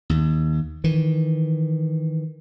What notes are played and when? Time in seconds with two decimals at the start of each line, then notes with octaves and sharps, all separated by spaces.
0.10 D#2
0.84 D#3 E3